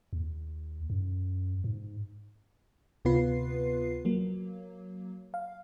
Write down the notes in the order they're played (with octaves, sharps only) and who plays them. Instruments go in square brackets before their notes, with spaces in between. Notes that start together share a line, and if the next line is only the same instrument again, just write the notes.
[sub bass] D#2
F#2
G#2
[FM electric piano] D2 C3 B3 F4 B4 C7
F#3 A#3
F5